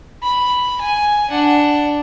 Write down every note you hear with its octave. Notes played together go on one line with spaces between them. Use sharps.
B5
G#5
D4 F#5